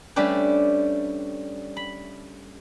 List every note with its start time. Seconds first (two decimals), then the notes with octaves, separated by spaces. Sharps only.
0.16 G3 A3 C#4 D4 G4 B4
1.77 B5